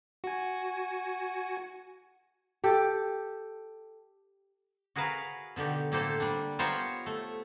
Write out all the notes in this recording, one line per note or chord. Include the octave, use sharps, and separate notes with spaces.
F#4 G#5
G4 A4
F#4 G#4 A#4 B4 F5
B2 D3 D#3 G4
A2 A#3 G4 A4 C5
G3 D4
B3 F4 G4 A#4 C5 C#5
A3